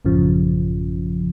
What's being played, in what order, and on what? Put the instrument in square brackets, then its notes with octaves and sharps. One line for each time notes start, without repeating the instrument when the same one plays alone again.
[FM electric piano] A1 F#2 C#3 F3